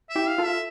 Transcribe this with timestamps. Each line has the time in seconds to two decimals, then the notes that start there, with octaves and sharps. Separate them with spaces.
0.09 E5
0.15 E4 G4
0.27 F5
0.38 F4 A4
0.45 E5